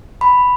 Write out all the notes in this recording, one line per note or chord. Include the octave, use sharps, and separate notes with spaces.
B5